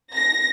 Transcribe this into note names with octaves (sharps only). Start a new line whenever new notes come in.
A#6